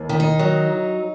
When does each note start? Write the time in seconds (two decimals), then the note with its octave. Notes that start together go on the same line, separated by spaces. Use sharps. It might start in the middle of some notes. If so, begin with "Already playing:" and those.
Already playing: D#2
0.09 D#3
0.20 D#4
0.39 F#3